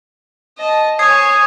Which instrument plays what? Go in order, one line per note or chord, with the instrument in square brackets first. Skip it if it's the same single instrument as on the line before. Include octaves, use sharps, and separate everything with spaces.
[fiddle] D#5 A5
[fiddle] C#5 G#5 [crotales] D#6 G#6 C7